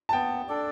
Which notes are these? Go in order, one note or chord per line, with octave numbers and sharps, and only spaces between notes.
A5
B3 G5
D4 A4 D5